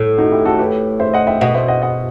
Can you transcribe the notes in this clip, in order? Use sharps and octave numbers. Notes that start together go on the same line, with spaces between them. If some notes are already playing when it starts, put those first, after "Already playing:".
Already playing: A2
D#4 F#4
E4 G4
F#4 A4
G4 B4
C5 E5
D#5 F#5
E5 G5
B2 D#5 F#5
C5 E5
D#5 F#5
D#5 F#5